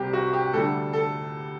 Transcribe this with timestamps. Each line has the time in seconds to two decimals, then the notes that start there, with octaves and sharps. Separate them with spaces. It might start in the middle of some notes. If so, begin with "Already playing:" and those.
Already playing: C2 C3 G3 G4
0.13 F#4
0.33 G4
0.53 D2 D3 G3 A4
0.93 A4